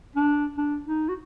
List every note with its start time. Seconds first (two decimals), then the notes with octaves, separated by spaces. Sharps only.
0.16 D4
0.57 D4
0.86 D#4
1.09 F#4